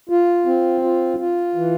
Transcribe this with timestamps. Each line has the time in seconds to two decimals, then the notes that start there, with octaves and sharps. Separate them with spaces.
0.09 F4
0.46 C4
0.83 F4
1.19 F4
1.55 E3